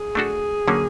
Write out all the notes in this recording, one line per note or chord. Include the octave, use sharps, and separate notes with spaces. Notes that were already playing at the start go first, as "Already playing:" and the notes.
Already playing: G#4
A3 D4 F#4 A4
D3 F#3 A#3 C#4